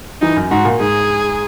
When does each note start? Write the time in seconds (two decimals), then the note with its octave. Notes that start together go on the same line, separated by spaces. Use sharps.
0.21 E3 D#4
0.37 F#2
0.51 G#2 F#4
0.65 A#2
0.80 G#2 G#4